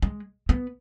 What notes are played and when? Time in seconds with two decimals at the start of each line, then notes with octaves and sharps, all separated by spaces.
0.02 G#3
0.49 B3